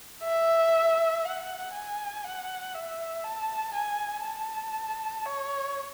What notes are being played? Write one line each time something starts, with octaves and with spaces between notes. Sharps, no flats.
E5
F#5
G#5
F#5
E5
A5
G#5
A5
C#5